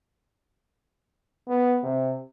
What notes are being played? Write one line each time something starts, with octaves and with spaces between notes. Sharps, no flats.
B3
C3